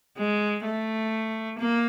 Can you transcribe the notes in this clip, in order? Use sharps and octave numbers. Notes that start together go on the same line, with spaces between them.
G#3
A3
A#3